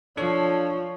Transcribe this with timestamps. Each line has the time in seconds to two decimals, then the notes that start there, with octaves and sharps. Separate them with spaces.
0.17 F3 D4 A4 C#5